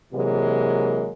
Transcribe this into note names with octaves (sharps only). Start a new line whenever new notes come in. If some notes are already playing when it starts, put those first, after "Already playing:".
C3 E3 F#3 G#3 A#3